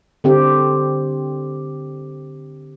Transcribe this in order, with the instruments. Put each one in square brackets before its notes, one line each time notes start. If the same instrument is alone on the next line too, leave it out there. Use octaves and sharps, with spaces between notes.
[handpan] D3 C4 G4